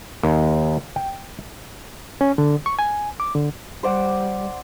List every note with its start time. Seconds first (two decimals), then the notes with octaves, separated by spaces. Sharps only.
0.23 D#2
0.96 G5
2.21 C#4
2.38 D3
2.66 C#6
2.79 G#5
3.20 D6
3.35 D3
3.83 G3 C5 D5 F#5